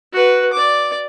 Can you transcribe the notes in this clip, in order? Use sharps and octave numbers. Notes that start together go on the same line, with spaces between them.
F#4 B4
D5 D6